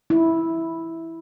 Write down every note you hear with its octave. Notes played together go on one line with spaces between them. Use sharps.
E4